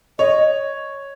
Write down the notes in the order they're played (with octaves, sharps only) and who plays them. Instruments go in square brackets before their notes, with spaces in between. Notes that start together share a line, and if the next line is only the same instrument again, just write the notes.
[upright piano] C#5 [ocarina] D#5